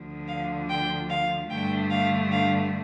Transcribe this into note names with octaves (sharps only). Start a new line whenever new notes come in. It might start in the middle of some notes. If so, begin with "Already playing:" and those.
Already playing: D2 D3 F3
F5
G5
F5
G2 D3 A3 G5
F5
F5